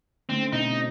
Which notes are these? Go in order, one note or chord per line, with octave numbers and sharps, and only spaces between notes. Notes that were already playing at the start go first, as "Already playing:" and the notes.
D3 A3 C4 C#4
B2 C4 D#4